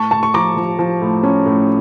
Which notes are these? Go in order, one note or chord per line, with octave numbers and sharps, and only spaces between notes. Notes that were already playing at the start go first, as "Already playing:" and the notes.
Already playing: A2 A5 C#6
A2 A5 C#6
C#6
F3 A#5 D6
F3
F3
A2
C#4
A2